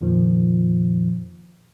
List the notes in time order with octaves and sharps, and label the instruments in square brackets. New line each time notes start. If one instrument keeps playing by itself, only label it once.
[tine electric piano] F2 A#2 D#3 F3